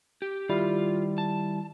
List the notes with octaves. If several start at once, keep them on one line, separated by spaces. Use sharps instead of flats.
G4
D#3 G3 E4 F4
A5